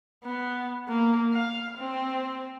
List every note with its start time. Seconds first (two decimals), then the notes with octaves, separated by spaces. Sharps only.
0.24 B3
0.88 A#3
1.33 F5
1.78 C4